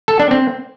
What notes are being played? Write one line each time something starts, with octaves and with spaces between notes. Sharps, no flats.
A4
D4
C4